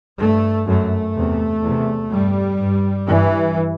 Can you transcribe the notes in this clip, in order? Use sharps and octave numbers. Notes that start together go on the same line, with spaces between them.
G2 A3
F#2 A3
E2 C3
E2 C3
G2 G3
G2
G2 E3